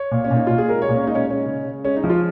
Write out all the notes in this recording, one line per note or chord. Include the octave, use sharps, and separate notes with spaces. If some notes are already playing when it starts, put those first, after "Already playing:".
Already playing: C#5
A#2
C#4
A#2
D#4
A#2 F4
G#4
G#3 A#4
C#5
A#2
C#4
G#3 D#4
C#4
G#3 C#4
C#3
C#3
G#3 C#4
D#4
F3
F4